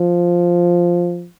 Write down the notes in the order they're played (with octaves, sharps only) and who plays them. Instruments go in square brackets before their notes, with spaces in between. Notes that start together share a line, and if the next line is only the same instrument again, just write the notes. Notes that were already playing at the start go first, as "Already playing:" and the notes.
Already playing: [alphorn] F3